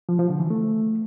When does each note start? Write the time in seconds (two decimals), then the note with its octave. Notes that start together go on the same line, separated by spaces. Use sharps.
0.09 F3
0.19 F3
0.29 D3
0.40 E3
0.50 A3